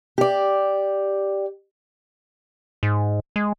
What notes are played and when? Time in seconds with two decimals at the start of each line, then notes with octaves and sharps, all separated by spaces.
0.18 G4 D5
2.83 G#2
3.36 G#3